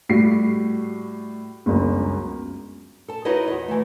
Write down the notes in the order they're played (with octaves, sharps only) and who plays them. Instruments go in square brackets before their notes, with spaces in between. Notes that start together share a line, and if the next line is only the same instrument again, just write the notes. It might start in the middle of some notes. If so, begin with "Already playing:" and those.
[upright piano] A2 G3 F#4 C7
G1 C#2 F#2
[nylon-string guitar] A4 A5
D#4 E4 F#4 B4 C#5 D#5
E2 D#5
E3 A3